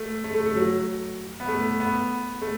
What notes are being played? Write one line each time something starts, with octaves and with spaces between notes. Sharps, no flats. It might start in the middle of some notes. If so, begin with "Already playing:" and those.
Already playing: A3
A3
A3
A3
F#3
B3
A3
B3
A3